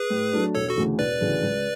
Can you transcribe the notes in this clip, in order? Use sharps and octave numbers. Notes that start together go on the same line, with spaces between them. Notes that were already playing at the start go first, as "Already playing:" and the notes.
Already playing: G#4 B4
A2
F#3 A3 D4
E1 A4 C#5
F#4 A4
D2 C#3 E3 A3
E1 B4 D5
D2 C#3 E3 A3
C#2